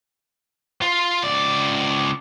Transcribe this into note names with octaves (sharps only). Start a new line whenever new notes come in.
F4
C#2 D5